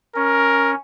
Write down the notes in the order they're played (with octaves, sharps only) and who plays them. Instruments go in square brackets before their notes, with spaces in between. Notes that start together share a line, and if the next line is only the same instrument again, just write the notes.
[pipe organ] C#4 [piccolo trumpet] A#4